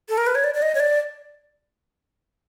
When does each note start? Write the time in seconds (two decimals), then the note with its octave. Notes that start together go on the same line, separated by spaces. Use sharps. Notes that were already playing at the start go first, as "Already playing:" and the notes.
0.09 A4
0.18 A#4
0.27 B4
0.35 C#5
0.44 D5
0.54 D5
0.62 D#5
0.75 C#5
0.80 D5